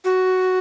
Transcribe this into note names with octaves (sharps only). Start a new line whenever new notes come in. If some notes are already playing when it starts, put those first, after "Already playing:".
F#4